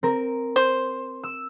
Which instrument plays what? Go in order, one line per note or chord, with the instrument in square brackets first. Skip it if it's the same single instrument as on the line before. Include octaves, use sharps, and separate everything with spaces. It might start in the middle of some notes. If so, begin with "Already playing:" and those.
[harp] C4 A#4
[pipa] C5
[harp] E6